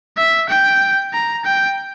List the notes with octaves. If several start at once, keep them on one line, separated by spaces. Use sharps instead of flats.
E5
G5
A#5
G5